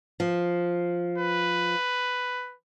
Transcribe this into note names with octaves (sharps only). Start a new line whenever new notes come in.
F3
B4